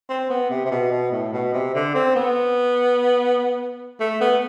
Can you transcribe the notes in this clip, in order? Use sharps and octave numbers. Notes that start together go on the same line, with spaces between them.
C4
B3
C3
C3
B2
B2
A2
B2
C3
D3
C4
B3
A3
B3